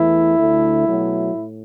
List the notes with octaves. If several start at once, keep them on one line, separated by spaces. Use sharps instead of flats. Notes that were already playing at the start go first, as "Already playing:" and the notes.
Already playing: E2 E3 A3 E4
D2 D3 A3
B2 F#3 A3
A2